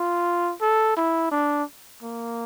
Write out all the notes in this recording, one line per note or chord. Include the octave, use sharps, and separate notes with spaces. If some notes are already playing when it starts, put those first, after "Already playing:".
Already playing: F4
A4
E4
D4
A#3